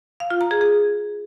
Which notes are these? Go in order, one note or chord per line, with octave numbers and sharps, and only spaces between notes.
F5
F4
A#5
G#4
G#4